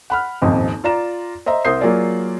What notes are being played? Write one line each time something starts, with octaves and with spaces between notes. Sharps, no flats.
F#5 B5 F6
D#1 G#1 F2 D#5
F4 D5 A#5 E7
C5 D#5 E5 A#5
C2 A#4 C5 D#6 G6 C7
F#3 A#3 F4 G#4 D5